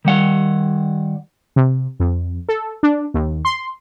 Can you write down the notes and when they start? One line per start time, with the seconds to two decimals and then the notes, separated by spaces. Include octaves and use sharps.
0.05 D#3 G3 F#5
1.56 C3
2.00 F2
2.49 A4
2.83 D4
3.14 D#2
3.45 C6